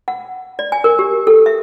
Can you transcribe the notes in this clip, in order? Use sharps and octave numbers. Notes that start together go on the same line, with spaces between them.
F#5
D5
G#5
A#4
G4
A4
E5